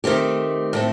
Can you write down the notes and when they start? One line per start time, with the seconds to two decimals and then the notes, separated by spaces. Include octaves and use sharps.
0.04 D#3 A3 C4 G4
0.73 A2 A3 C4